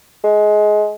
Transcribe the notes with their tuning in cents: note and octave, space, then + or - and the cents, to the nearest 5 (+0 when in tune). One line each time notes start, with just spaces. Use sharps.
G#3 +20